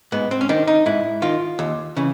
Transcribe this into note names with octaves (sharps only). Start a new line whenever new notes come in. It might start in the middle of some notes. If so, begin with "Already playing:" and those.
G#2 B3
C4
C#4
D#3 D4
D#4
G#2 E4
D#3 F4
D#2
C#3 E3